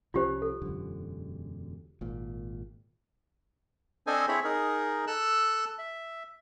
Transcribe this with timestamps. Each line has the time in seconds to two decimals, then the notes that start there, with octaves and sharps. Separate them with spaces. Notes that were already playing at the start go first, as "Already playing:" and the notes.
0.14 C2 F3 C#4 F4 G4 C5
0.42 A4
0.62 E1 F#2 D3
2.01 G#1 A#2
4.07 C4 D4 A4 C5 D#5 G#5
4.28 C4 E4 G#4 C#5 B5
4.44 D#4 G#4 A#4
5.07 A4 E6 F#6
5.78 E5